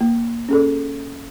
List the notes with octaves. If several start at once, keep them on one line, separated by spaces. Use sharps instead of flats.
A#3
C#4 G#4 A4